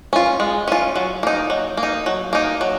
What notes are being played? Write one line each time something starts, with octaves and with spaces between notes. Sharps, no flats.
C#4 F4
G#3
C#4 F4
F#3
A#3 D#4
F#3
A#3
D#4
F#3
A#3 D#4
F#3